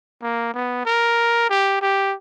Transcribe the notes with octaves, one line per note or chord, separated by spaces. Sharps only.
A#3
B3
A#4
G4
G4